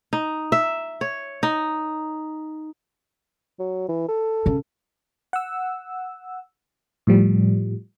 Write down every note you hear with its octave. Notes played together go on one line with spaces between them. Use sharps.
D#4
E5
C#5
D#4
F#3
E3
A4
C#3 C#4
F#5 E6
A2 F3 G3